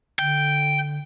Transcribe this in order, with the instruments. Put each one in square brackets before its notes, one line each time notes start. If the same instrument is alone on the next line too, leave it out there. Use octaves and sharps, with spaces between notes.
[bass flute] D3 [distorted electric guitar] G5